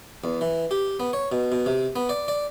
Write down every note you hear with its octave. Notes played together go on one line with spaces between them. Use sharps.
E2
E3
G4
B3
C#5
B2
B2
C3
B3
D5
D5